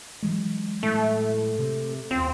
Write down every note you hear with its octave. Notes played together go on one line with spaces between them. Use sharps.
E3 F#3 G#3
A2 A3
C3
D1 D#2 C4 F4